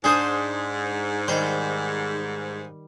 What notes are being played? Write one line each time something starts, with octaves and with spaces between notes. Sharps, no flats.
G#2 D4 G#4 C5 G#5 D#6
D#3 G3 C5